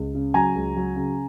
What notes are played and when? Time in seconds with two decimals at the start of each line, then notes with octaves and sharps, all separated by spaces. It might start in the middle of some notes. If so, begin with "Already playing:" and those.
Already playing: C#2
0.15 C#3
0.34 F#3 G#5 A#5
0.55 C#2
0.77 F#3
0.96 C#3